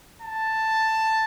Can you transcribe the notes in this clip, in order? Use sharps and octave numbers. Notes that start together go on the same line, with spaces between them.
A5